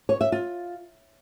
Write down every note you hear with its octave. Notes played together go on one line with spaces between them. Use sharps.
C#5
E5
F4